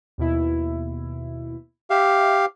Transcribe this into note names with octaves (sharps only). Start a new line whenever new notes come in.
D#2 B2 E4
G4 E5 F5